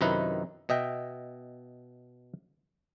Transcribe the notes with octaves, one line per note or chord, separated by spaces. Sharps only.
F#2 C3 D#3 D#4 E4 B4
B2 D#5 E5 G5